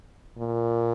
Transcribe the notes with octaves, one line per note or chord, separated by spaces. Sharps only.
A#2